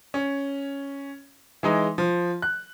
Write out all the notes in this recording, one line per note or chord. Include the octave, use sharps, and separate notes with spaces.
C#4
E3 G#3 D#4
F3
F#6